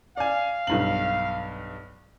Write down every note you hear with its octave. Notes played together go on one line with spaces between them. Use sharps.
D5 F5 G#5
B1 G2 F#7